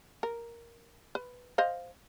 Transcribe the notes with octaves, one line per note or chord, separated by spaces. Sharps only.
A#4
B4
C5 D#5 F5